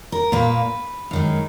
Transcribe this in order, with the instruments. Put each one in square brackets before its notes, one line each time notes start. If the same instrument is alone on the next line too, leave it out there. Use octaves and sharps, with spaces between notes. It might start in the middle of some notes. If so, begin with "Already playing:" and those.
[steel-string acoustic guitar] A#4
A#2 A#3 B4
F#2 D#3 G#3